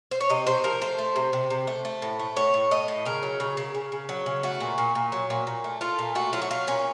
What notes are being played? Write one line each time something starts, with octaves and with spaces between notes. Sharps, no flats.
C5
C#5
C3 D#5
C3 C5
F3 A#4
A3 C5
A3
C3
C3
C3
A3
A3
A2
A3
A2 C#5
A2
A3 D#5
A2
C#3 A#4
F#3
C#3
C#3
C#3
C#3
F#3
C#3
A3 F#4
A#2
A#2
A#2
F#3
A#2
A#2
A3
A3 F4
A#2
A3 F#4
F#3 F4
F#4
F#3 F4
A#2 C#4